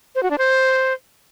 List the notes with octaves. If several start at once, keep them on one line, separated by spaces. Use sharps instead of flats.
C5
F#4
D4
C5